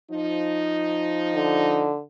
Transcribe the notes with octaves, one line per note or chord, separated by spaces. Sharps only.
F3 D#4
D3